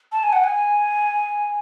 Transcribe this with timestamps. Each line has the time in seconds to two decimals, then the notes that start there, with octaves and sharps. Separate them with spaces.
0.12 A5
0.23 G#5
0.33 F#5
0.44 G#5